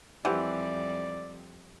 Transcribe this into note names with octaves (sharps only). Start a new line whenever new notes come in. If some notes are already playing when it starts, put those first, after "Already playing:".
F2 E3 G3 C4 G4 D5 F#5